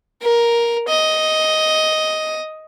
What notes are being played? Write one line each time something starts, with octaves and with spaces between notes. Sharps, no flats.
A#4
D#5